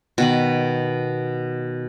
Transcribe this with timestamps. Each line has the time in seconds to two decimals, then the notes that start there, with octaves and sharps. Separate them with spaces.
0.18 B2 D#3 B4